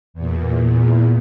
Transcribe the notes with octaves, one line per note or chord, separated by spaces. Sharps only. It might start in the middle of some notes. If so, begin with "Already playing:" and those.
E2 A#2